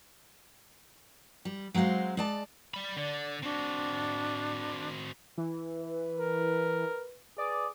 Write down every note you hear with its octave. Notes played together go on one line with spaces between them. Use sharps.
G3
F#3 G#3 C4 C5 F5
G#3 D5 A5
D5 B5
D3 D5
C4 D4 F#4
E3
B4
A#4
G#4 B4 D5